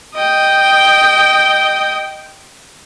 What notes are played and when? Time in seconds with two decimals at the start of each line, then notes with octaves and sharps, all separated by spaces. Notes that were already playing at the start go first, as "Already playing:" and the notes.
0.15 D#5 G5